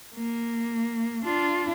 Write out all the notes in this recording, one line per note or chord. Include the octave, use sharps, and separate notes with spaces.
A#3
D4 F4